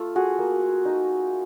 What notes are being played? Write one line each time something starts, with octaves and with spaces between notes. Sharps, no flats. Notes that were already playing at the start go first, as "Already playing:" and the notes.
Already playing: A3 F4
F#4 G#4
A#3
D#4